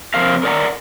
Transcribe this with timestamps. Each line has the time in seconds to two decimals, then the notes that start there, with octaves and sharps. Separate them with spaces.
0.14 C3 F3 C4 A#4 F5
0.43 A#4 D5 F#5 A#5